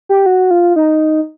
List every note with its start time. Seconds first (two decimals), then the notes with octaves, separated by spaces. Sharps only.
0.09 G4
0.26 F#4
0.51 F4
0.76 D#4